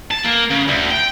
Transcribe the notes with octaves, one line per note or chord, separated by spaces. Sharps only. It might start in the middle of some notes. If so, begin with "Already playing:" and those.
A5
A#3
C#3
D2
G5